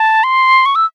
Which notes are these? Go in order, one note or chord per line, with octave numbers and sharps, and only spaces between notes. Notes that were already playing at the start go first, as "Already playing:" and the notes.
Already playing: A5
C6
C#6
E6